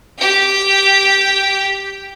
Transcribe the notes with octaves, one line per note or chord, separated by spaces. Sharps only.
G4 G5